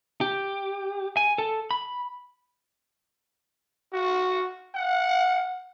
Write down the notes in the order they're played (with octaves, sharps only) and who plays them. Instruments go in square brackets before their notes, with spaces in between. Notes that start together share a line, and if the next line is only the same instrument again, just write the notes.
[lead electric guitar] G4
G#5
A4
B5
[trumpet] F#4
F#5